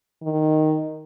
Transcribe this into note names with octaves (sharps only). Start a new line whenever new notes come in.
D#3